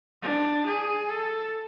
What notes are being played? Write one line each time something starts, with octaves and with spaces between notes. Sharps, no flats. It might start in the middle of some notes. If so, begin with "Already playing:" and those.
D4
G#4
A4